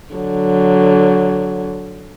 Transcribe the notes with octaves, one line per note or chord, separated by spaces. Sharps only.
D3 F#3